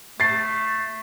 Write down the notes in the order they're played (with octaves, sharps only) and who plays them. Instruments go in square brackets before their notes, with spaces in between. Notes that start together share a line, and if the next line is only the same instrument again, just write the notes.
[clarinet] A3 [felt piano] A6 C7